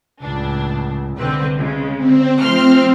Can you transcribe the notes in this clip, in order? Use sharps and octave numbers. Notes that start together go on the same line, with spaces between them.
C#2 A2 D4
C2 D3 C4 B4
C#3 G#3
D3 C4
F3 A3 C4 C6 F6